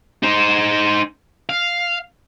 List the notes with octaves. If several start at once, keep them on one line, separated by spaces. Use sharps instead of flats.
D#4 C5
F5